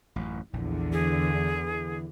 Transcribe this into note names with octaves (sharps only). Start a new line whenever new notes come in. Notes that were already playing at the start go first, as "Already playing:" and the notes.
A1 F#2
A#1 E2 D3
E3 G#4